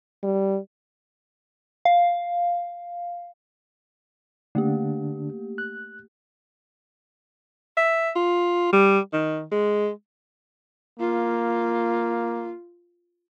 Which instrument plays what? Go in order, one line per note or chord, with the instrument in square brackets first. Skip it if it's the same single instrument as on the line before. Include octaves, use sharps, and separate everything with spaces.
[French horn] G3
[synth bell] F5
[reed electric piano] D3 D4 [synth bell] A3 A#3 G4
[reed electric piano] F#6
[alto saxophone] E5
F4
G3
D#3
G#3
[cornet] A#3 [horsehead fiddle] F4